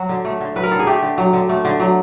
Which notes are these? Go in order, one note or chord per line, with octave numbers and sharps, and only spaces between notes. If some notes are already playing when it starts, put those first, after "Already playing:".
Already playing: F#3 F#4
D3
A3
D3
F#3 B4
A#4
D3 A4
G#4
A3 G4
D3
F#3
D3
A3
D3
F#3